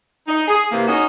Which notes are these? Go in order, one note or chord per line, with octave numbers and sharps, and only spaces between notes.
D#4
G#4
C3 E3 A#3
C#4 D#4 F#4 G#4